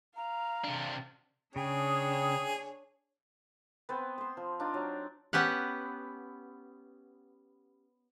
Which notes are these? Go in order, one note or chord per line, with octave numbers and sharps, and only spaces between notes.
F5 A#5
C3 D4
C#3 D4 G#4 C#5 G5 D#6
B3 C4 C5
C5 C6
F3
D4 D#4 F4 F5
F#3
B3 C#4 G4 F#5